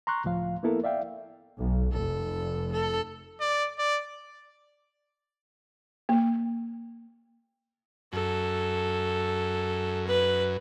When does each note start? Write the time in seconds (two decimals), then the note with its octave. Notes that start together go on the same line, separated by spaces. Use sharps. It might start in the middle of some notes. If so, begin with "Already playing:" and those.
0.07 A#5 C6 C#6 F#6
0.24 C#2 A2 F3 F5
0.63 A#3 B3 E4 A4 A#4
0.84 D5 E5 F5 G5
1.57 B1
1.92 F1 A4
2.72 A4
3.40 D5
3.79 D5
6.09 A#3
8.13 F#2 A4
10.07 B4